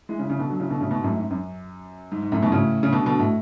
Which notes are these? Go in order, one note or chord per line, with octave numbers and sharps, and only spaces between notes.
E3 G#3
C#3 E3
C#3 E3
B2 D3
D3 F#3
C#3 E3
B2 D3
A2 C#3
G#2 B2
F#2 A2
G#2
F#2
G#2
G#2
F#2 A2
G#2 B2
A2 C#3
C#3
B2 D3
B2 D3
A2